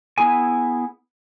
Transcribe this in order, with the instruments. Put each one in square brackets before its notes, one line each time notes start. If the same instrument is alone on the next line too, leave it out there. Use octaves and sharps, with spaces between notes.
[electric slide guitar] B3 E4 G#4 G#5